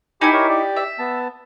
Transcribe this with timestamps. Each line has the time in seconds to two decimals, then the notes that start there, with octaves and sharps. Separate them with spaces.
0.21 D#4 E4 G4 G#5 B5
0.33 G4 A#4 C#5
0.49 G4 D5
0.76 E5
0.99 B3 A5